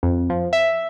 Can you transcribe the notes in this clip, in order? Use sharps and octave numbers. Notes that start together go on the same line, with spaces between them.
F2
F3
E5